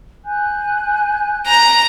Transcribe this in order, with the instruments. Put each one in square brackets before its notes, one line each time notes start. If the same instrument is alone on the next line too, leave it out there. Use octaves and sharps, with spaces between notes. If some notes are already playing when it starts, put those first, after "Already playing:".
[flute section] G#5 F#6 G6
[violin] A#5